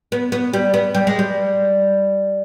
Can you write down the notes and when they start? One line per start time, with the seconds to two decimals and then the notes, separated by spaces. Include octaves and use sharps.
0.12 B3
0.32 B3
0.54 G3
0.74 B3
0.95 G3
1.07 G#3
1.19 G3